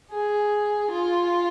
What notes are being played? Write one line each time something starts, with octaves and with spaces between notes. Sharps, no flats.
G#4
F4